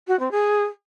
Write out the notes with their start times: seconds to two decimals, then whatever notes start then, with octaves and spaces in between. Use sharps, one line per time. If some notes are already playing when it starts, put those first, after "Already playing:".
0.08 F#4
0.19 C4
0.31 G#4